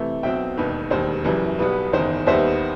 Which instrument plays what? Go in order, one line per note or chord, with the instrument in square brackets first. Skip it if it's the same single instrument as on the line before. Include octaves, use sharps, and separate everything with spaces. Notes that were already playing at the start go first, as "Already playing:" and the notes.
Already playing: [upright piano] C3 E3 A3
B1 B2 F#3 C4 E5 G5
E1 D#2 D#3 B4
E1 D#2 D#3 G3 C5
F#1 F#2 E3 G3
B1 B2 G3 B3 B4
F#1 E2 D#3 C5
D#2 D#3 G3 B3 C5 E5